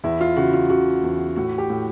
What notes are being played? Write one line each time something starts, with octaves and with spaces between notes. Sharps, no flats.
E2 E4
F4
C#3 F#4
F4
C#3 F#4
E2
A2 F#4
G4
A2